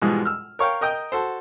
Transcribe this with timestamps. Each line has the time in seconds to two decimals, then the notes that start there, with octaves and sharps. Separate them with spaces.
0.02 G#2 B2 E3 F3 G3 G#3
0.25 E6 F6
0.59 A#4 C#5 F5 G5
0.81 A#4 D#5 G5 D#6
1.12 F#4 A4 C5